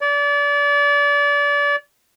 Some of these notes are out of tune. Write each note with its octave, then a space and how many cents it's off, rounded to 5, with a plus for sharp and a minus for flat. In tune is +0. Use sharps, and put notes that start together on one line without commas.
D5 -30